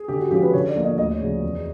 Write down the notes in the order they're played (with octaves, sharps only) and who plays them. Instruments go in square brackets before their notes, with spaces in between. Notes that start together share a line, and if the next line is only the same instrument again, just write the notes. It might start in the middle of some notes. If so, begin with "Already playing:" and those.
Already playing: [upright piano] G#4
[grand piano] D3 [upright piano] G4
[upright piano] F#4
[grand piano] F3 G#3 C#4 F#4 [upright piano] G4
[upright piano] B4
[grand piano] D3 [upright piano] C#5
[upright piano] D5
[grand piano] F3 A#3
[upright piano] D#5
[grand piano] D2 [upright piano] D#5
[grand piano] C#3 F3
E2